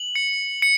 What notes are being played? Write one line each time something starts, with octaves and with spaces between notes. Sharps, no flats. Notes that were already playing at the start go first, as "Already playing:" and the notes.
Already playing: F#7
C#7
C#7